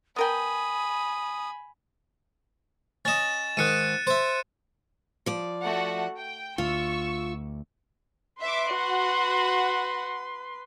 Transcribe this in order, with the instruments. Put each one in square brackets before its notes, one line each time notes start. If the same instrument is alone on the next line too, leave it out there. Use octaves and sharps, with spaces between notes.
[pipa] B3 A#4 G5 [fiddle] G#5 B5 [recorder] D#6
[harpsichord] C#4 D#5 [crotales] A6 E7
[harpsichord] G#2 D#3 [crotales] F#6 C#7 D#7
[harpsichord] C5 E5
[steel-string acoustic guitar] F3 D5
[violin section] A3 F#4 F#5
G5
[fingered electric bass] D2 [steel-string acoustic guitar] F4 [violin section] C#6 E6
[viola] B4 C6 [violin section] E5 D6
[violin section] F#4 F#5